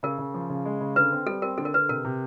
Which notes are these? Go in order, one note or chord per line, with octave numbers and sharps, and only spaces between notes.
C#3 A#4
C#3
F3
C#3
G#3
C#3
D3 B4
C4
G3 A4
C4 A#4
D3 A4
A#4
D3 B4
C3 A#4
C3